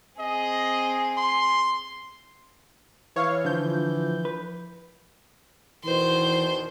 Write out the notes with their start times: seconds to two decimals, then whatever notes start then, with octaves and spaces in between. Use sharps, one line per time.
0.19 C4 G#4 D#5
1.17 C6
3.16 E3 C#5 F5
3.45 D3 F3 G6
4.25 B4
5.84 E2 B2 D#3 E3 C5